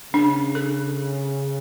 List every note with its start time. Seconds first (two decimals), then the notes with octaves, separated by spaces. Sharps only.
0.13 C#3 D4
0.55 A4